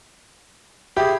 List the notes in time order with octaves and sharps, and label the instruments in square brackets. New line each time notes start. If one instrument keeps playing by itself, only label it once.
[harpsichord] E4 G#4 [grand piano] G4